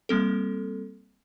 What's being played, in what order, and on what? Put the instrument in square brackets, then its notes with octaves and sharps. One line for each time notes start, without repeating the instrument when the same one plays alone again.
[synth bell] G3 A#3 C4 A4